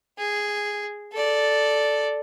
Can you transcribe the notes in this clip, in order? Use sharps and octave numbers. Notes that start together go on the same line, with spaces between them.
G#4
A4 D5